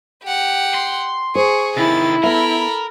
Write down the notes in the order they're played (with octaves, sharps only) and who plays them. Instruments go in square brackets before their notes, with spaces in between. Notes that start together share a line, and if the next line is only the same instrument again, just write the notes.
[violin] G4 F#5
[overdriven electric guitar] C6
[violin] G#4 [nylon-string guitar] C5 [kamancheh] C#6
[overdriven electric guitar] C3 D#3 [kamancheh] E4 [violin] A6
[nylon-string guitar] B3 E5 [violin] A4 B5 [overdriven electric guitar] A#4